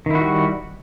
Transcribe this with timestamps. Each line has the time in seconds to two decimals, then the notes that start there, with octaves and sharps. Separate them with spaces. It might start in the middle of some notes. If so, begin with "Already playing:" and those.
0.06 D#3
0.11 E4
0.15 F#4
0.20 G3